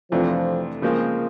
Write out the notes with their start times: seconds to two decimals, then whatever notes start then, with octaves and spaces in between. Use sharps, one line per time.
0.12 F2 C3 E3 F3 A3 D4
0.82 C#3 F3 G#3 A#3 C4